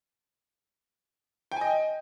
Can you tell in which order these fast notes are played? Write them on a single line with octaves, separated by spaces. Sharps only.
G5 G#5 D#5